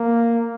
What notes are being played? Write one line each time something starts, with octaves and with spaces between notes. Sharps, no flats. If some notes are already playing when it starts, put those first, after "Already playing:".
Already playing: A#3